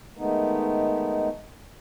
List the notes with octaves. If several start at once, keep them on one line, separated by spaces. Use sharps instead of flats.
D#3 G#3 A3 B3 D#4